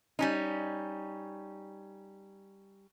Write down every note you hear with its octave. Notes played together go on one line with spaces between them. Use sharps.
G3 C#4 D#4